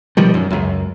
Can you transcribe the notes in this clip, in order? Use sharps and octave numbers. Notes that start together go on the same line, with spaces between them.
B2 D#3 F3 G3
F#2
C#2 F#2